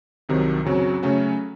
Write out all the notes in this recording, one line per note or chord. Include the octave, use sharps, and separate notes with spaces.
C2 C3 D#3 F#3
F#2 C#3 F#3 C4 F#4
C#3 F#3 A3 C#4 F#4